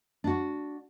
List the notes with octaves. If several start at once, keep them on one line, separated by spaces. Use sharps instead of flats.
D4 F#4